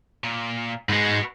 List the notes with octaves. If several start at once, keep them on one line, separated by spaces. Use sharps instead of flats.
A#2
G#2 G#3 F#4 B4